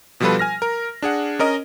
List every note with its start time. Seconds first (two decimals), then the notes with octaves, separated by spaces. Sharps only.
0.20 B2 F3 G3 F4 A4 B4
0.39 G#5 F6 A#6
0.62 A#4
1.02 D4 G#4 F#5
1.39 C#4 A#4 D#5